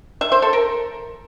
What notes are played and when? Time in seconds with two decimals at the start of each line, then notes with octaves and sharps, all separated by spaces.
0.21 E5
0.32 C5
0.42 A4
0.53 A#4